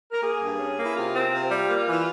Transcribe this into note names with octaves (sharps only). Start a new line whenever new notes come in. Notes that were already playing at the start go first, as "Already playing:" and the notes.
A#4
A#3 G#4
G2
C#4
A#3
E4
C3 F4
C4
C3
G3
A#3
E3